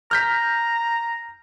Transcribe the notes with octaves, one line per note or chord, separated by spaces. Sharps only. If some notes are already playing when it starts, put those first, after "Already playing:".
A#5 F6 G6 B6